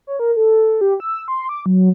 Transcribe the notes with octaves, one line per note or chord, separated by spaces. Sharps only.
C#5
A#4
A4
G4
E6
C6
D6
F#3